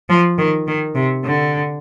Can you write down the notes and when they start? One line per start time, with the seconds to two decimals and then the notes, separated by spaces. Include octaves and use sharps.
0.09 F3
0.38 D#3
0.67 D#3
0.95 C3
1.25 D3